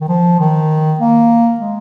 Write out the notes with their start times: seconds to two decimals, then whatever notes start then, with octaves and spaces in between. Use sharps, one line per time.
0.01 D#3
0.08 F3
0.39 D#3
0.99 A#3
1.60 G#3